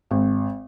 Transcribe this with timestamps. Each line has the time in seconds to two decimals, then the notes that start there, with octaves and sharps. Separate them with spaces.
0.11 G#1